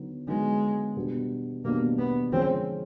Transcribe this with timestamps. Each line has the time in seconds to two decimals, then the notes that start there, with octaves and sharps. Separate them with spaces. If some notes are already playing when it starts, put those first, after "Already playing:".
Already playing: D3 F#3 B3 D#4
0.27 D3 F#3 G#3 B3 D#4
0.96 B2 G3 B3 D4
1.64 B2 G3 A#3 B3 D4
1.99 B3
2.32 D3 F3 G#3 C4 C#4